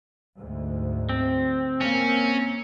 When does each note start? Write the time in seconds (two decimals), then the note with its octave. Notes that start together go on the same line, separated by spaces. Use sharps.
0.37 D2 G#2
1.09 C4
1.81 A#3 C#4